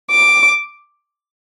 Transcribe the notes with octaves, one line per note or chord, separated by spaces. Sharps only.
D6